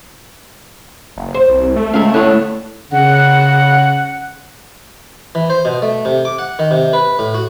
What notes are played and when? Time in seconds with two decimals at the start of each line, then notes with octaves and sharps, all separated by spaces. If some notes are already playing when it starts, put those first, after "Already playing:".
1.17 F#1
1.34 C5
1.49 C2
1.76 A3
1.94 C#2 E4 F5
2.14 A2 D3 B3 C#5
2.92 C#3 F#5
5.35 E3
5.50 C5
5.65 B2
5.82 A3
6.05 C3
6.25 D6
6.39 F#5
6.59 D#3
6.71 C3
6.93 B4
7.19 A2
7.34 F#4